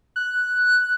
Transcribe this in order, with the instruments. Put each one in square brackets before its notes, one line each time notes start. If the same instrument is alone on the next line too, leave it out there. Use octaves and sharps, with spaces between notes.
[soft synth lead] F#6